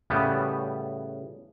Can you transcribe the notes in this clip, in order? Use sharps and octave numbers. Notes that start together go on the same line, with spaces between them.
A2 C#3 G3 B3